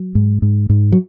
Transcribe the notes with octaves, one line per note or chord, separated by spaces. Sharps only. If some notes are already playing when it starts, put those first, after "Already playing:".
Already playing: F#3
G#2
G#2
G#2
F#3